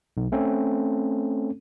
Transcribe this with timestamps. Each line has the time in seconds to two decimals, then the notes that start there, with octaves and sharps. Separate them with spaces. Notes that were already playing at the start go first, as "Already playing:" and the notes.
0.17 B1
0.32 A3 C4 C#4 A4